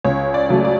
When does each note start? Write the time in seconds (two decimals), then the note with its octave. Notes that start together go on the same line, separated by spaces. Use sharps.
0.05 C#2 C#5
0.34 D5
0.49 C#3 F#3 A3
0.64 D5